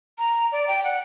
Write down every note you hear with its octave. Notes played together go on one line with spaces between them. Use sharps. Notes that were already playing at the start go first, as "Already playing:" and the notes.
A#5
D5
G5
F#5